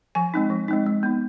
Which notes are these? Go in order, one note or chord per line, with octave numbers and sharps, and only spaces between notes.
F3 G#5
G#3 C4 D#4
F3
G#3 C4 D#4
G#3
B3 D#4